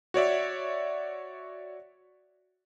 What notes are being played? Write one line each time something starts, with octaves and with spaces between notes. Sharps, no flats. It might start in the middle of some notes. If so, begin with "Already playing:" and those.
F#4 C#5 D5 E5